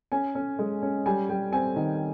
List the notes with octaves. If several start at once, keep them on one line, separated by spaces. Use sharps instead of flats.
C#4 G#5
C#4
G#3
C#4
G3 G#5
G3 G5
C4 G#5
D#3